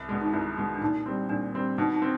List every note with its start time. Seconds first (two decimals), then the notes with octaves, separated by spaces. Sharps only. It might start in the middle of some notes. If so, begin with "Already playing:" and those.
Already playing: C2
0.09 B2 G#3
0.21 D#4
0.33 C2 E4
0.57 B2 G#3
0.75 D4
0.81 A#2 D#4
1.06 G3 C4
1.29 A#2 D4
1.54 G3 C4
1.78 B2 D#4
1.94 D#4
2.02 C4